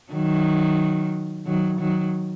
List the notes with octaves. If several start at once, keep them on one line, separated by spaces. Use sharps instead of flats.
D#3 F#3
D#3 F#3
D#3 F#3